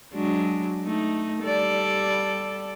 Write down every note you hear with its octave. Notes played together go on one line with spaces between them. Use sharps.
F#3 G#3 D4
A3 D#4
G3 A4 D5